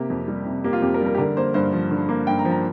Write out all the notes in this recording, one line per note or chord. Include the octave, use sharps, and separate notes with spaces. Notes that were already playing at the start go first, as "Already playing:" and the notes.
Already playing: C3 A#3 G4
F2
G3
C3
A#3 G4
F4
F2 G4
A#4
G3
A#4
G4
D3 A#4
A#3 C5
G2 C5
F3
D3
A#3
G2 G5
A#5
F3
A#5